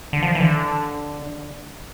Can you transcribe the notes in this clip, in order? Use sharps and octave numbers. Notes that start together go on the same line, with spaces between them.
D3
F3
E3
D3